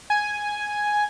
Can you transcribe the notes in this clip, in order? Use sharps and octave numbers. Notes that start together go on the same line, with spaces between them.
G#5